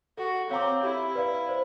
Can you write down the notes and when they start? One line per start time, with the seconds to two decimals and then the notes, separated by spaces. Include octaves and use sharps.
0.17 F#4 A4
0.50 C4 C#5 F5 A#5 D6
0.83 E4 G4
1.15 B4 D5 F5
1.49 C5